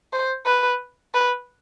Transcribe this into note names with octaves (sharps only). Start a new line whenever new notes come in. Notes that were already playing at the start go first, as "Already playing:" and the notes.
C5
B4
B4